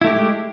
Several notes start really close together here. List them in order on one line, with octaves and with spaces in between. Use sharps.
E4 A3 G4 G#3